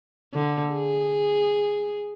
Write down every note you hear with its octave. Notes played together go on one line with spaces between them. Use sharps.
D3
G#4